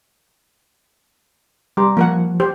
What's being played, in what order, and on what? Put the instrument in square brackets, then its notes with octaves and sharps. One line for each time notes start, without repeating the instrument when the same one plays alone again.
[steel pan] G3 G4 [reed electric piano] A#5 C6 D6
[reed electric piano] F3 [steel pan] A#3 A#4 F#5
[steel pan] G4 C5